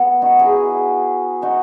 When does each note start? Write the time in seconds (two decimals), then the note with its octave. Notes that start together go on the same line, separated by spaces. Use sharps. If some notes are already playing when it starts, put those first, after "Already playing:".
Already playing: B3
0.22 D#4 F#4
0.39 E4 G#4
1.42 D#4 F#4